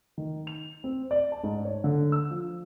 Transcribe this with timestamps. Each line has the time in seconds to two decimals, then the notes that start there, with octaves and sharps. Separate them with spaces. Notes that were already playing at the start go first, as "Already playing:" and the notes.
0.18 D#3
0.47 F7
0.84 C4
1.11 D5
1.32 A5
1.44 G#2
1.65 C#5
1.84 D3
2.12 E6
2.31 F3